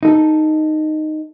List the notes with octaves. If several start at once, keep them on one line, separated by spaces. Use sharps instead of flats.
D#4 A4